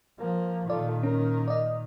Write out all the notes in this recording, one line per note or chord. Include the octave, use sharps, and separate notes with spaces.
F3 A#3
A#2 D#3 F4 A4 D5
C#4 A#4
D5 D#5